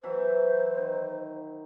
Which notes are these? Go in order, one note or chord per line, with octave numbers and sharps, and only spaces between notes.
E3 F#3 C5 E5
D#3